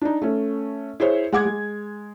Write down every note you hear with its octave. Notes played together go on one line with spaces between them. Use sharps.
D4 D#4
A3 C#4
E4 G#4 C5 C#5
G#3 F#5 D6 G#6
G#3